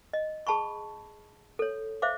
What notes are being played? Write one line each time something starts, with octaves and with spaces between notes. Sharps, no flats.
D#5
G#4 A5 B5 C#6
A4 C#5
C5 E5 F5 D6